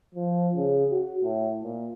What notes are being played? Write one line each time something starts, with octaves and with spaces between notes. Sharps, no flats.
F3
C#3
F#4
A2
A#2